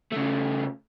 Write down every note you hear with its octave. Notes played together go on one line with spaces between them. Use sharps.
C#3 A3